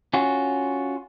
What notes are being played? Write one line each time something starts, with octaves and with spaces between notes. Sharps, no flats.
C#4 F4 F#4